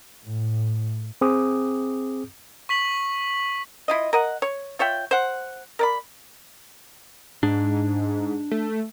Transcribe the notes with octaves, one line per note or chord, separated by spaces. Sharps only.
A2
C4 G#4 D6 D#6
C#6 B6 F#7
E4 F4 D#5
A#4 D#5 F#5
C#5
F4 C#5 E5 G5
C5 F#5
A#4 D5 B5
G#2 D4
A3